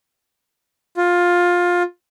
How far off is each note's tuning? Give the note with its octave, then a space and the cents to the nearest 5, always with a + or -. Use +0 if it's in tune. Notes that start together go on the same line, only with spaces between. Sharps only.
F4 +15